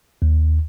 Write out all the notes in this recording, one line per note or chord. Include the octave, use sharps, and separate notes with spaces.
D#2